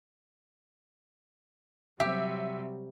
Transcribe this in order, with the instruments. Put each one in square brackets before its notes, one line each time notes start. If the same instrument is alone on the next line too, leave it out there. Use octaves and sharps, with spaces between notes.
[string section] C3 F#3 G3 [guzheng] G4 [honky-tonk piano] E5